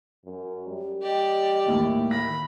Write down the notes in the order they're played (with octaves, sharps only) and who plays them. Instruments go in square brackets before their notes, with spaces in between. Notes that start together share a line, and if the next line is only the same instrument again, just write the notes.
[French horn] F#2
G3
[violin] G4 D5 [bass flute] D#5
[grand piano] D#2 A2 [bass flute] D#3
[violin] B5 [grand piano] A#6